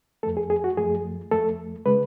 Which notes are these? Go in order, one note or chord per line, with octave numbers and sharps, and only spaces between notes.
F2 F3 A3 A4
G#4
G#4
F#4
F#2 F3 A3 G#4
F2 F3 A3 A4
C#3 G#3 B4